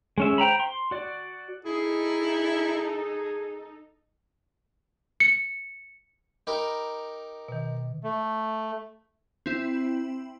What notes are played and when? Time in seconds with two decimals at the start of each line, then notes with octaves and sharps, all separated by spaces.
0.18 G#3 C#4 E5
0.38 C5 G5 A#5 B5
0.60 C6
0.91 F#4 D5
1.65 D#4 E4 G#4 A4
5.20 C#7
6.47 D#4 G4 A#4 B5
7.48 B2 D#3
8.03 A3
9.46 C4 E4